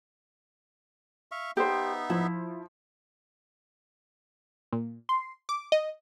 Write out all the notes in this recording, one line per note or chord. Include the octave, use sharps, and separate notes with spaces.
E5 F5 C#6
B3 D#4 G4 C5 E5
F3 E4
A#2
C6
D6
D#5